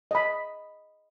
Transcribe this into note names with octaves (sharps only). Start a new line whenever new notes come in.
D#5 B5